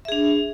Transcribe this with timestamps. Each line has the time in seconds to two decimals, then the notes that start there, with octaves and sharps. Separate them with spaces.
0.05 E5
0.08 G#4
0.12 D4